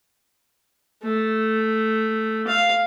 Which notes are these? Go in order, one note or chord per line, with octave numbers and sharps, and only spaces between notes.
A3
F5